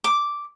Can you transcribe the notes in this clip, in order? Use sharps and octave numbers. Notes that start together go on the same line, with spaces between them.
D6